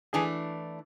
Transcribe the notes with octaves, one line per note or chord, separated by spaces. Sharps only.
E3 A3 D4 G#4 G#5